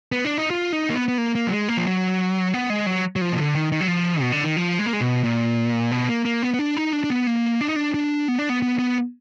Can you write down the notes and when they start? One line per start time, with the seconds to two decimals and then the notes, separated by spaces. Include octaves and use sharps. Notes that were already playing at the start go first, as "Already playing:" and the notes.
0.12 B3
0.25 D4
0.38 D#4
0.51 F4
0.72 D#4
0.90 A#3
0.95 B3
1.08 B3
1.18 A#3
1.35 A#3
1.47 F#3
1.51 G#3
1.69 A#3
1.77 F3
1.86 F#3
2.54 B3
2.70 G#3
2.86 F#3
3.16 F#3
3.21 F3
3.32 B2
3.37 D3
3.55 D#3
3.72 D#3
3.81 F#3
3.88 F3
4.21 B2
4.32 D3
4.44 D#3
4.57 F3
4.79 G#3
4.86 A#3
4.93 G#3
5.01 B2
5.24 A#2
5.91 B2
6.09 A#3
6.25 A#3
6.43 B3
6.54 B3
6.59 D4
6.77 D#4
6.93 D4
7.04 D4
7.10 B3
7.27 A#3
7.61 D4
7.68 D#4
7.76 D4
7.94 D4
8.28 B3
8.39 D4
8.49 B3
8.62 B3
8.79 B3